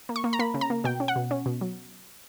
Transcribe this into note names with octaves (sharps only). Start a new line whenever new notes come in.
A#3
C#6
A#3
A#5
A#3 B5
C#3
A#5
A#3
B2 G5
C#4
F#5
B2
C#4
B2
F#3